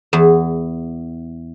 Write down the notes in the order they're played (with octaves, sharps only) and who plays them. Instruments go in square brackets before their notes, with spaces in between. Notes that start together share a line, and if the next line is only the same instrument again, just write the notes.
[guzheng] E2